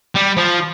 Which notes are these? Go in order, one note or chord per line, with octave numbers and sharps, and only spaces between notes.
G3
F3